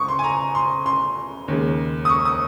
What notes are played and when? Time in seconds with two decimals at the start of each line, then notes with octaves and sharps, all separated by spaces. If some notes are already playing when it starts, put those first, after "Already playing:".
Already playing: C#2 C#6 D#6
0.08 C6
0.19 G#5
0.24 A#5
0.55 C6
0.86 C6
1.48 D#2 C#3 G#3
2.05 D#6
2.09 C#6
2.25 D#6